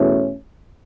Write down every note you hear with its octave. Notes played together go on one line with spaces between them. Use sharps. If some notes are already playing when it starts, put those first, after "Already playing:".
Already playing: E2 B2 A3 C#4